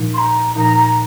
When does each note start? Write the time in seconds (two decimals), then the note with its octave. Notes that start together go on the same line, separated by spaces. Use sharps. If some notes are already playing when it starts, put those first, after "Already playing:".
Already playing: A#2 F3 D#4
0.14 C6
0.18 A#5
0.55 A#2 F3 D#4 A#5
0.77 A#5